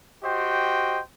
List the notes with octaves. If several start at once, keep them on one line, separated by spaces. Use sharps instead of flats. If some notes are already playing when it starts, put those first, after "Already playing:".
F#4 G4 C5 D#5 G5